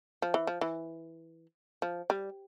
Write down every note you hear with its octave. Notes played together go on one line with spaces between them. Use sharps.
F3
E3
F3
E3
F3
G3